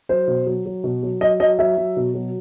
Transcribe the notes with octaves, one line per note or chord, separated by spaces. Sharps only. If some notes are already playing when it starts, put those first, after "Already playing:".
F#3 C5
B2
F#3
F#3
B2
F#3
F#3 D#5
F#3 D#5
F#3 E5
F#3
B2
F#3